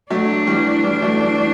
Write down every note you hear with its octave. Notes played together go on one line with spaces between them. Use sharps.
F#3 A3 D4
E3 G3
E3 G3
F#3 A3
E3 G3
E3